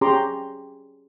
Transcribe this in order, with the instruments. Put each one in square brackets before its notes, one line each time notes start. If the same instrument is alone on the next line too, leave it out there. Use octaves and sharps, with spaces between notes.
[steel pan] C#4 G4 G#4 A#5 C6 D6